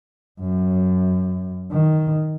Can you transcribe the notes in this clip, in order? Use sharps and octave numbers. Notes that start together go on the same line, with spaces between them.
F#2
D#3